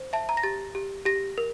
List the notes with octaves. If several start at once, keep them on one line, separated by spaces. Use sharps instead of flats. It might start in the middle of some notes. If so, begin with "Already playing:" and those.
Already playing: C5
E5 A5
A#5
A#6
G4 A6
G4
G4 A#6
A#4